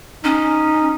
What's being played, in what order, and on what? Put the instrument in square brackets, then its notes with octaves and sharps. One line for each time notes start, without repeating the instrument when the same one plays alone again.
[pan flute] C#4 [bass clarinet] D#4